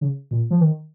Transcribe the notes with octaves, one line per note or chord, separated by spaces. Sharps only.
C#3
A#2
F3
D#3